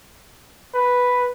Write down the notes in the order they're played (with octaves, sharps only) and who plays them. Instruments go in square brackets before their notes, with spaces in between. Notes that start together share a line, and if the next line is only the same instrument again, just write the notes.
[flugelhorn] B4